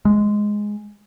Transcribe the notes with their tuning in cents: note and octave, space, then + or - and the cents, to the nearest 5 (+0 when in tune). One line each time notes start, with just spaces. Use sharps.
G#3 +0